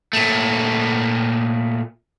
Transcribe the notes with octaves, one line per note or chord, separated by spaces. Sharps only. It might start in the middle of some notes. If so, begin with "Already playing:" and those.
A#2 A3